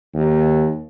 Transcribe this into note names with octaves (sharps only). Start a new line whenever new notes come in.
D#2